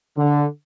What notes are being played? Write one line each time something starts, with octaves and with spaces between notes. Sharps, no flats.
D3